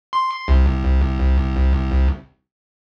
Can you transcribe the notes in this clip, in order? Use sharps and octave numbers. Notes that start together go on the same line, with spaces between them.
C6
C2